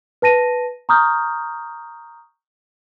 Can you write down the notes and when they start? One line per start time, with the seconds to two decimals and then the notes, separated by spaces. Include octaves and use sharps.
0.22 B4 A5 A#6 D#7
0.89 A#5 C#6 D#6 F6 G6